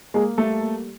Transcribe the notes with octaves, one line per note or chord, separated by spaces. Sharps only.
G#3 A#3 G#4
G3 A3 A4
A#3